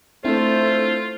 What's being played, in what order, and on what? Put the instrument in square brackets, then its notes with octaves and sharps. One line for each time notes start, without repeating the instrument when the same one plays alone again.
[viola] A3 [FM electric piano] C4 D4 E4 [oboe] F4 [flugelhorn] C5